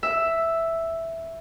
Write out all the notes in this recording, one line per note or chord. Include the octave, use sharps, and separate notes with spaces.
E5